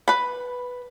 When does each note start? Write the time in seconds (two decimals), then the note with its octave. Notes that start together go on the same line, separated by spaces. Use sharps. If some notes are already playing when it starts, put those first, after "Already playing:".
0.08 B4 B5